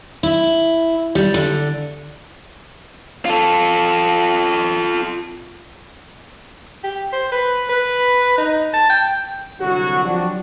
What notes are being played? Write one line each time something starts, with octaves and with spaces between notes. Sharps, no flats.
E4
G3
D3
F4 A4
G4
C5
B4
B4
D#4
A5
G5
C2 D3 F#3 F#4
F3 F#3 D4 F#4 G4